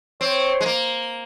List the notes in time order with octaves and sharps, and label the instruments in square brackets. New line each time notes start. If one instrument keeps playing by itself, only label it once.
[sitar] C4 [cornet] C#5
[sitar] G#3
A#3